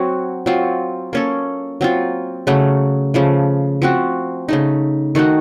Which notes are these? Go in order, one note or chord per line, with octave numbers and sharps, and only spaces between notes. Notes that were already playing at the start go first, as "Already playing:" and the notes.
Already playing: F#3 C4 F#4
F#3 C4 F4
A#3 C#4 A4
F#3 C4 F4
C#3 F#3 A3
C#3 F3 A3
F3 C4 F#4
C#3 A3 D#4
D#3 A3 D#4 F#4